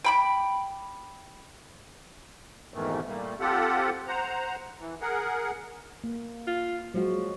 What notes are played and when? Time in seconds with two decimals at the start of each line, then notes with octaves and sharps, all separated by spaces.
0.05 G5 B5 D6
2.74 F2 G#2 B2 D#3 E3 A3
3.06 A#2 G3 A3 A#3
3.40 C4 F4 G4 A4 F#5
4.08 C5 F#5 A#5
4.80 E3
5.01 G#4 A#4 F#5
6.04 A#3
6.47 F4
6.94 F3 F#3 G#3 F#4